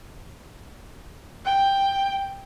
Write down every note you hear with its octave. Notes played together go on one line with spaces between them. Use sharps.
G5